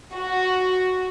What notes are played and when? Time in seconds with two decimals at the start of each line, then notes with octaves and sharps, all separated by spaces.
0.15 F#4